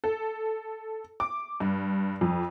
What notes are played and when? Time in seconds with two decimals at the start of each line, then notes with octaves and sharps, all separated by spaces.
0.04 A4
1.20 D6
1.60 G2
2.21 F2